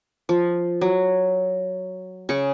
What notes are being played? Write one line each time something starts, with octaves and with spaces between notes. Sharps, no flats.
F3
F#3
C#3 G#4 C#6